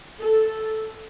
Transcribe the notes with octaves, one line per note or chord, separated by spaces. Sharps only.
A4